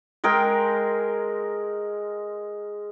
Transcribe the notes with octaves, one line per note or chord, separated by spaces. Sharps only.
G#3 G#4 A#4 G5